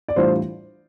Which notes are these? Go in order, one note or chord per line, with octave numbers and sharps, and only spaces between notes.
D5
A2 E3 G3 D4 F4 C5